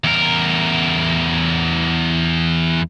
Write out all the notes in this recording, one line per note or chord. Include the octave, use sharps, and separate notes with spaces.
E2 A#4